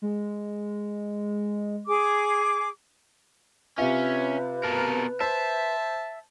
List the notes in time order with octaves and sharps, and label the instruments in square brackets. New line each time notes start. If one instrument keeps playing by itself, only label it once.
[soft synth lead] G#3
[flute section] G#4 D6
[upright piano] C3 F4 [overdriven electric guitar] C#4 [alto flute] B4 [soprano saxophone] E5
[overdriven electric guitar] B2 A#4 [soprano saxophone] A5
[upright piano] C5 [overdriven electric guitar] E5 [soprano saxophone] A5